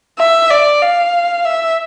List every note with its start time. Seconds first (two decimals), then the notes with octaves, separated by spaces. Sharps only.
0.19 E5
0.51 D5
0.82 F5
1.45 E5